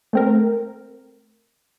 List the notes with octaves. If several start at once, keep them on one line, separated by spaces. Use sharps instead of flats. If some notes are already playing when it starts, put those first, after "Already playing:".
A3 C4 A#4